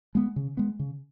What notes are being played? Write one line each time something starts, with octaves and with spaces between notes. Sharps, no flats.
G#3 B3
C#3
G#3 B3
C#3